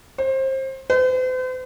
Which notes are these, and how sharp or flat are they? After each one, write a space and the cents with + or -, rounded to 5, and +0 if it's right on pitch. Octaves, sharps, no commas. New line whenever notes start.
C5 +25
C5 -45